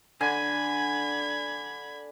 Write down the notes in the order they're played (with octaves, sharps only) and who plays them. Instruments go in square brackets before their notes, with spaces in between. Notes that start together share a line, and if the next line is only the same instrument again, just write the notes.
[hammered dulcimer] D3 G#5 [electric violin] B5 G#6